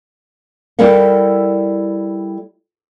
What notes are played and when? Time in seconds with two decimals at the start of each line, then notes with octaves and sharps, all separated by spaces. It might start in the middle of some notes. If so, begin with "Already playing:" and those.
0.79 G3 E4 A4 A#4 F5 F#5